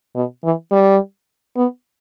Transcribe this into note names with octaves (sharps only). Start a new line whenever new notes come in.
B2
E3
G3
B3